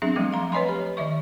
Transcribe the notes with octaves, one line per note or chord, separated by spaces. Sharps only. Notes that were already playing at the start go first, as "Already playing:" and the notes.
F#3 B3 C4 D4 G#4 E5
F3 G3 A3 D6
F5 A#5 C6
B4 C#5 D#5 G#5 B5 C6
G4
D#3 D#5 E5 C#6